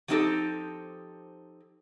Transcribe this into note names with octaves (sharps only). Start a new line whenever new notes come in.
F3 F#3 C4 D#4 G4 A4